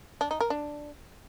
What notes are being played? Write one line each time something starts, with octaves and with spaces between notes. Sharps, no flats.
D4
D#4
A#4
D4